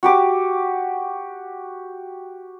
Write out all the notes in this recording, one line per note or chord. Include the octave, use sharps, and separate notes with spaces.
F#4 G4 D6